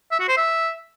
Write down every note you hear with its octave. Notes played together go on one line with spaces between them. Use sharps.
E5
F#4
C5
E5